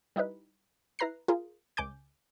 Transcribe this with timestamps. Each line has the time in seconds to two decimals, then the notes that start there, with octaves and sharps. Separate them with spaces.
0.16 G3 D#4 E4 B4
0.99 E4 B4 A#5 F#6 C7
1.28 F4 G#4 A#4
1.77 C#2 G#5 D6 G6